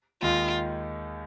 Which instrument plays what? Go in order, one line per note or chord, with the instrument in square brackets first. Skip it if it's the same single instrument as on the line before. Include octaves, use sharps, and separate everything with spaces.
[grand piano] D#2 D#3 G#3 D#4 G#4 [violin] F4